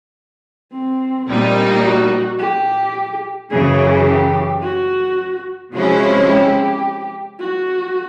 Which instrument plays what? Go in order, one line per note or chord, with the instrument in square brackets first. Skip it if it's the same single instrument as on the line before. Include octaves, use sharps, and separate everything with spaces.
[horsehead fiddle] C4
[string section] A#1 A#2 G3 A#3 D#4
[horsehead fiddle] F#4
G4
[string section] F#2 C#3 E3 [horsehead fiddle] G#4
[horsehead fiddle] G4
F#4
[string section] C3 F3 G#3 C#4 E4 [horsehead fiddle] F#4
[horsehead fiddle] G4
F#4